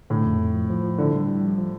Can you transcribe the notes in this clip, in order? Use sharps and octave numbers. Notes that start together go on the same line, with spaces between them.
A2 D3
F2
F2
F3
F3
F3
D3 E4
G3
G3
F3
F3